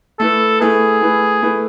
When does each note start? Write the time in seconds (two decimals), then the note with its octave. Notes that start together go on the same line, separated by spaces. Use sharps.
0.19 A3 E4 A4 B4
0.60 A3 E4 G#4 B4
1.02 A3 E4 B4
1.42 A3 E4 B4